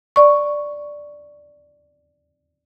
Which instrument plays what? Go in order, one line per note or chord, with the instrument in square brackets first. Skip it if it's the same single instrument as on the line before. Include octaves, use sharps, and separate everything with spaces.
[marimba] D5 C#6